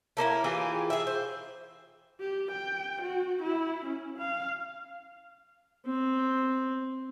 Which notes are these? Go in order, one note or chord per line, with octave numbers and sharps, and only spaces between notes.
A3 A#3 C#4 E4
E3 F4 G4 G#4
G#4 E5
C5
G4
G5
F#4
E4
C#4
F5
C4